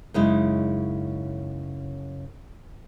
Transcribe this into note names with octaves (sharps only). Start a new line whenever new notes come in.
F#2 C#3 G#3 D#4 E4